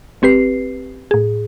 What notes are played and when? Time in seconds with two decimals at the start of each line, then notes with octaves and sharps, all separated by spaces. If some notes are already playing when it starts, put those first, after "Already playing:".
0.22 G#1 C4 G4 B4 C7
1.11 A2 G#4